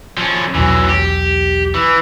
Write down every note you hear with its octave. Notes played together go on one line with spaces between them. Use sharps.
F3 C#4
B1 E2 E3 F#3
G4
E3